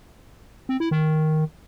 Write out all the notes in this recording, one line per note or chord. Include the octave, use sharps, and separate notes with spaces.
C4
E4
D#3